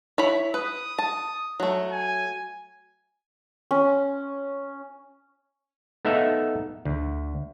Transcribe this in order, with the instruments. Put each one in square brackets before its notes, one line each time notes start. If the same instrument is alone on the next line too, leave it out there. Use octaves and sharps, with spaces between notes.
[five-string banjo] E4 C#5 B5
[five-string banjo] B4 [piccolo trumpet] D#6
[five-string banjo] A5
F#3 A3
[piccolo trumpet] G#5
[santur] C#4
[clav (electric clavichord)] A3 B3 D#4 A4 E5 F5
D2